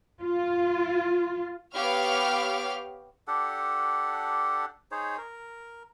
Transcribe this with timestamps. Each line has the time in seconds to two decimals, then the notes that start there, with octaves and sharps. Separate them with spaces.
0.22 F4
1.74 B3 G4 C#5 F5 F6
3.28 D4 G4 A4 F#5
4.91 D#4 G#4 C5 C#5
5.18 A#4